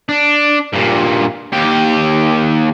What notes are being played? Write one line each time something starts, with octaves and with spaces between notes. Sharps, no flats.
D4
G2 A#2
D#2 G4